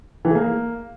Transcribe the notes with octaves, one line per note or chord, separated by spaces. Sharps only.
E3
G#4
A#3